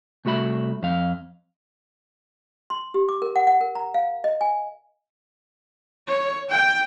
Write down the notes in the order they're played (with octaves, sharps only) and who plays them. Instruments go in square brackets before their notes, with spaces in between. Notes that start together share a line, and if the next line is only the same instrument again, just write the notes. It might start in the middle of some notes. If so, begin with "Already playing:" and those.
[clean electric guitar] C2 A3 F#4 E5 B5
F2 F5
[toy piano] C6
G4
D6
A#4
F#5
F#5
A#4
A#5
F5
D#5
G#5
[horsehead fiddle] C#5
G5